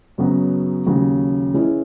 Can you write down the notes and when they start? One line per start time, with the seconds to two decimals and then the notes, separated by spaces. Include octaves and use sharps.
0.18 F#2 C#3 F#3 B3
0.86 D#2 C#3 F#3
1.54 E3 G#3 C#4 E4